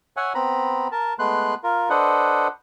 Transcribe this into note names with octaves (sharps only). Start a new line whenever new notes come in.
C#5 E5 F#5 G#5
B3 C4 A#5 B5
A#4 A5
G#3 A3 B3 B4 C6 F#6
F4 A#4
D4 A4 B4 C5 D#5 F#5